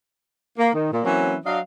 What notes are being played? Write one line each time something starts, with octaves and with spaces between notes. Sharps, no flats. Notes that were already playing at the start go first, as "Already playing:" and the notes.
A#3
D#3
A#2
E3 F#3 A#3 C4 C#4
F#3 D4 D#5 F5